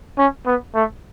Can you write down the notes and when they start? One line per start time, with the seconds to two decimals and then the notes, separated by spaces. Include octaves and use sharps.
0.18 C#4
0.46 B3
0.75 A3